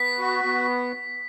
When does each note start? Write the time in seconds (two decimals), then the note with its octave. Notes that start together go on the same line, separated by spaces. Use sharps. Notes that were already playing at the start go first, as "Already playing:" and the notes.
Already playing: B3 B6
0.19 F#4
0.44 B3